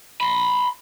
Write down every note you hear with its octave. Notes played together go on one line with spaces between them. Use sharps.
B5 C6